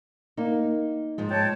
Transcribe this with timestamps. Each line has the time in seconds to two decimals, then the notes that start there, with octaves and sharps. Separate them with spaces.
0.37 A#3 D#4
1.18 G#2 F3 G#3
1.30 C#5 G5 A5